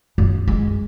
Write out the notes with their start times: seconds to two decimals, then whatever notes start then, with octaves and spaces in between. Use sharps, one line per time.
0.18 F#2
0.47 G#3